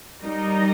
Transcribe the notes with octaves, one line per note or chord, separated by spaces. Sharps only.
G3 D#4 A#4 D#5